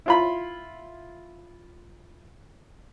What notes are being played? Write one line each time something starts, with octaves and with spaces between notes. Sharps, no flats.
E4 F4 B5